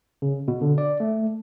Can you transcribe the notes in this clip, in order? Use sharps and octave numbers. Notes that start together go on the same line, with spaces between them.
C#3
B2
D3
D5
A3